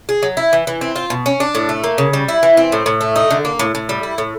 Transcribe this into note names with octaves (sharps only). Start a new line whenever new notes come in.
G#4
F#3
E4
E3
E3
C4
F4
B2
C#4
D4
A2
A3
A#3
C#3
G3
E4
E3
C4
A2
A2
A3
D#4
D3
A#3
A2
A2
G3
E4
A2